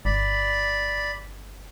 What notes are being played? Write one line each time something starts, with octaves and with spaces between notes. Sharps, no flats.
G1 D5 B5